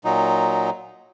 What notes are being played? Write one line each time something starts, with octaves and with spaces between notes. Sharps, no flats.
A#2 F#3 D#4